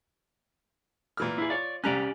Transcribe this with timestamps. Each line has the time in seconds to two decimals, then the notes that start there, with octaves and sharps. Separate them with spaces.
1.17 A#2 E3 F6
1.38 E4 G#4
1.50 F4 C#5 D5
1.84 C2 C#4 G4 D5 A#5 F#6